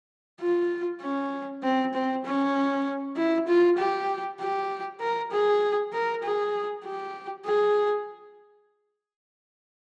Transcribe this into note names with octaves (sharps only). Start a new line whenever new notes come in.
F4
C#4
C4
C4
C#4
E4
F4
G4
G4
A#4
G#4
A#4
G#4
G4
G#4